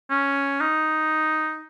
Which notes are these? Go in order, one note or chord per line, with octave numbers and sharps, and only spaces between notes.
C#4
D#4